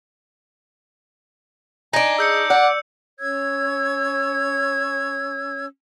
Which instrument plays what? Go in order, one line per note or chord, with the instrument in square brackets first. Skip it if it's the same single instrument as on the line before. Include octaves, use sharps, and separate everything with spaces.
[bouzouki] D4 D#4 [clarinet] G#5
[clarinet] G#4 [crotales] E6 G6 C#7
[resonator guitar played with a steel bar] D5 [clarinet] F#5
[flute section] C#4 C#5 E6 G#6